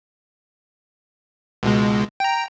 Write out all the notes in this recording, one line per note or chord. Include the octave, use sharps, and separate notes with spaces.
C#2 B2 G#3
G5 A#5